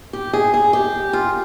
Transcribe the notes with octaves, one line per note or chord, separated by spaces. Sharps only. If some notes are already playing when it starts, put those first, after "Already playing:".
G4
G#4
G#4
G4
F4